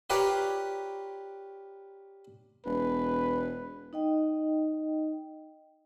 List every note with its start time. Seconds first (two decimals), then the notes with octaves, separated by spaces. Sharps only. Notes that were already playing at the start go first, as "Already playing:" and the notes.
0.10 F4 G4 B4 C#5 D5 A#5
2.66 E1 B4
3.93 D#4 D#5 G5